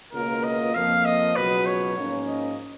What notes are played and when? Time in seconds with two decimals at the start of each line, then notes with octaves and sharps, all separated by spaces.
0.13 C#2 B2 A#3 F4 A#4
0.44 D#5
0.75 F2 F3 A#3 F5
1.05 D#5
1.36 C#2 B2 F#3 B4
1.66 C#5
1.97 G#2 F3 A#3 C#4
2.28 D#5